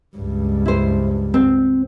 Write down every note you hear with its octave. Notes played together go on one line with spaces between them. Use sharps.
C#2 G2
E4 C5
C4